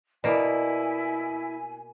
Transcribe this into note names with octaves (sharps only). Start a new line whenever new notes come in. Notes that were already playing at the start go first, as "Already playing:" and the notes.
B2 A#3 E4 D5 D#5 G#5